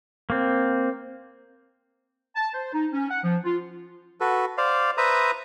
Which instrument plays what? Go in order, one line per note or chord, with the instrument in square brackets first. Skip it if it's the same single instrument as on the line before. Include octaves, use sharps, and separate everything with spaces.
[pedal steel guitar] A#3 C4
[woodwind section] A5
C5
D#4
C#4
F#5
F3
F4
[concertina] F#4 A4 B4
C5 D5 F5
B4 C5 E5 A#5 D#6